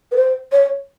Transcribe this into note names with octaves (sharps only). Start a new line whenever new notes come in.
B4
C5
C#5